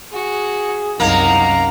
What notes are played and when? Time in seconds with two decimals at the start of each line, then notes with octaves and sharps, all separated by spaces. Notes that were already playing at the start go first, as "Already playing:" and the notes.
0.13 F#4 G#4
1.00 C2 F#2 A#3 D#4 F#5 A#5